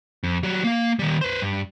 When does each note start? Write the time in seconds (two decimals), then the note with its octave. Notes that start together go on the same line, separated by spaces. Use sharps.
0.23 F2
0.43 F#3 G3
0.64 A#3 F5
0.99 D#3 G3
1.21 B4 C5
1.41 G2